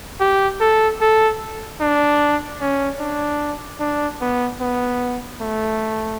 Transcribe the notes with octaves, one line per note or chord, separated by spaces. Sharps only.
G4
A4
A4
D4
C#4
D4
D4
B3
B3
A3